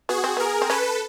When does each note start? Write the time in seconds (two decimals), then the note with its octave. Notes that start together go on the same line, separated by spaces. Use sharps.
0.09 B3 F#4 G#4
0.24 C4
0.37 B3 G#4 A#4
0.62 C4
0.70 C#4 A4 B4